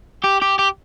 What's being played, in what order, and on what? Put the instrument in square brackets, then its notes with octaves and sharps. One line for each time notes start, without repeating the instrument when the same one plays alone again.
[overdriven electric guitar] G4
G4
G4